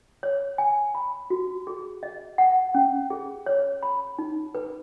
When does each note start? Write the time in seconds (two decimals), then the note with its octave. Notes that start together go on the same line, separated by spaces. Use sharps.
0.23 C#5
0.58 G#5
0.95 B5
1.30 F#4
1.67 G#4
2.03 D#5
2.38 F#5
2.75 C#4
3.10 G#4
3.46 C#5
3.83 B5
4.19 D#4
4.55 B4